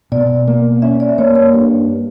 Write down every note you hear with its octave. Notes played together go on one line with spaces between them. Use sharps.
B2 D5
A#3
C#4 E5
D5
A#3 C#5
C#5
G2